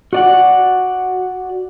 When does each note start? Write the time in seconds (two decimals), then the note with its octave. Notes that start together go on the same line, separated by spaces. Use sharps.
0.13 F#4 D5 F#5